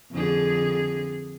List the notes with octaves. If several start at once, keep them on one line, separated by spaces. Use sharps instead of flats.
F2 D3 G#4